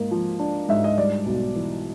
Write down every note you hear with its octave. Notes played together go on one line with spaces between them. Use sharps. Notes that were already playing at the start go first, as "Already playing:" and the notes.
Already playing: G#2 A#3
F3
D4
G#2 E5
D#5
G3 D5
B1
E3